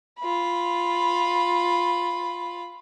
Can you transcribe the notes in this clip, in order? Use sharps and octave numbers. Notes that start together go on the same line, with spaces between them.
F4 B5